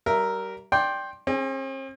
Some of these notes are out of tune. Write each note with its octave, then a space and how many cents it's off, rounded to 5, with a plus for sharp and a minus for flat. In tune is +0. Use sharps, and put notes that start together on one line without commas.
G3 -30 A#4 +0 E5 +0
D5 +0 G5 +0 C6 +20
C4 +45 G#4 +0